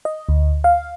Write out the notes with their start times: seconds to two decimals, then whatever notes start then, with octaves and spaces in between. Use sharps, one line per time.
0.05 D#5
0.29 D2
0.64 F5